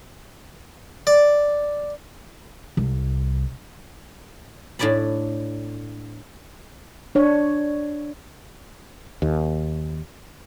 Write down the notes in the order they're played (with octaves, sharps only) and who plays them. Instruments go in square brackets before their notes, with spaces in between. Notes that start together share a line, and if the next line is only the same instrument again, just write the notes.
[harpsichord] D5
[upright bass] C2
[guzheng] A2 D4 D5 G#5 B5
[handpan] D4 C#5
[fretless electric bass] D#2